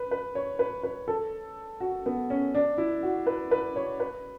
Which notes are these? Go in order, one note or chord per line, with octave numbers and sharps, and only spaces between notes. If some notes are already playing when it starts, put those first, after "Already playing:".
Already playing: B4
B4
C#5
B4
B4
A4
F#4
B3
C#4
D4
E4
F#4
B4
B4
C#5
B4